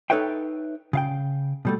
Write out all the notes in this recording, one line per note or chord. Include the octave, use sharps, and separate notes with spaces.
D#4 A4 B4 C#5 E5 G5
C#3 F5 G5
B2 G3 A3